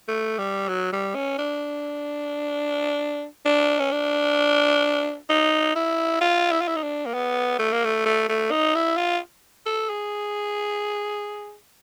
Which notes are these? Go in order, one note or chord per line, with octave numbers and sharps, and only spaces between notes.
A3
G3
F#3
G3
C#4
D4
D4
C#4
D4
D#4
E4
F4
E4
F4
E4
D#4
D4
A#3
B3
A3
A#3
A3
A3
A3
D#4
E4
F4
A4
G#4